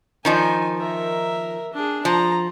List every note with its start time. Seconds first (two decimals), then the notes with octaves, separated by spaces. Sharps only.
0.25 D#3 F3 D#4 G#5
0.78 A#4 E5
1.74 D4 G#4
2.05 F3 A#5